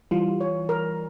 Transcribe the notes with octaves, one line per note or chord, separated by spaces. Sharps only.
E3 G3 F4
C#5
A#4